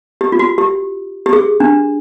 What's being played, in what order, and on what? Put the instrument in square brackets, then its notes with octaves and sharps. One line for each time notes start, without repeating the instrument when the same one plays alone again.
[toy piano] G4
F4
F#4
G4
G4
G#4
D4